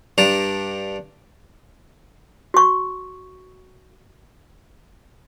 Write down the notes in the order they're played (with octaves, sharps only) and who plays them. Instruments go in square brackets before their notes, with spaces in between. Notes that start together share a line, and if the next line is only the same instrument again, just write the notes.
[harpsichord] G2 D4 A#5
[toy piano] F#4 C#6